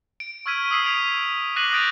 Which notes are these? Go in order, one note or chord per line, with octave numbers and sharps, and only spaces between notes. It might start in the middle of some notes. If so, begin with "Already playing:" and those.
D7
C#6 E6 F6 G#6 B6 D#7
D#6 E6 B6 C7 D7
E6 F6 G#6 D7 F7
D6 F#6 A#6 C7 D#7 F#7
D#6 F#6 G6 A6 D7 F7